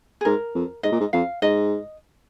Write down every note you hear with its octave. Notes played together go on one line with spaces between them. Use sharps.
G#4
G#2 A#4
F2
G#2 D#5
A#2
G#2
F2 F5
G#2 D#5